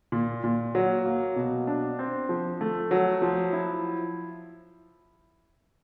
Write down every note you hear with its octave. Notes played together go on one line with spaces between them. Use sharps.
A#2
A#2
F#3
A#3
B2
D4
C4
F3
A3
F#3
F3
E4